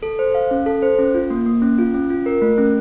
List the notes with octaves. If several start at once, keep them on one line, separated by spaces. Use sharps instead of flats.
A4
C5
F5
C#4
A4
C5
C#4
F4
A#3
A#3
C#4
F4
C#4
F4
A#4
A3
C#4